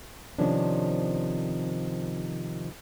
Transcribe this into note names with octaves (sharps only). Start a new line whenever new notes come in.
C3 D#3 F3 C#4 D4